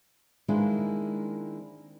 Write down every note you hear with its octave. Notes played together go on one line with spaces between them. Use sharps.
D#3 G#3 A#3 C4 D4 E4